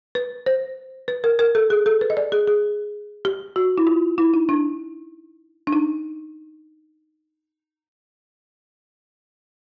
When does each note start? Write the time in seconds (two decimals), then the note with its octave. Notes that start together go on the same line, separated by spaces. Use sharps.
0.15 B4
0.46 C5
1.08 B4
1.24 A#4
1.39 A#4
1.55 A4
1.70 G#4
1.86 A4
2.01 B4
2.10 D#5
2.17 D5
2.32 G#4
2.48 G#4
3.25 G4
3.56 F#4
3.78 E4
3.87 F4
4.18 E4
4.34 D#4
4.49 D4
5.67 D4
5.73 D#4